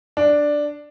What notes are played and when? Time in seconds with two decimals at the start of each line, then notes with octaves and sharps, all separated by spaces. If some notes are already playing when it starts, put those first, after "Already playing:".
0.17 D4